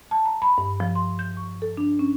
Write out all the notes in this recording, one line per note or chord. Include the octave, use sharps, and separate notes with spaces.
A5
A#5
B5
G2
F3
C6
G6
C#6
A4
D4
C#4